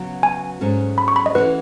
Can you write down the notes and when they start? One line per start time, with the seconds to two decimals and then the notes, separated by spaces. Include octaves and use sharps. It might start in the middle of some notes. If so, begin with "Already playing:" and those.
Already playing: C#3 F#3 B3 F#4
0.23 G#5
0.60 G#2 F#3 A3 C#4
0.98 B5
1.08 C#6
1.16 B5
1.26 D#5
1.35 E3 A3 C#4 F#4 B4